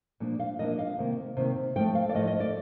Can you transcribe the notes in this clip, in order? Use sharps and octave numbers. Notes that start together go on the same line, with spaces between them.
A#2 F3 A#3 D4
F5
A#2 F3 A#3 D4 D#5
F5
C3 D#3 A#3
C3 D#3 A#3
A2 F3 A3 G5
F5
D5
A2 F3 A3 D#5
D#5
D5